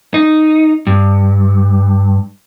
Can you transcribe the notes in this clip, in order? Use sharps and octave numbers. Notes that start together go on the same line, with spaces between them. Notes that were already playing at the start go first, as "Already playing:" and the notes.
D#4
G2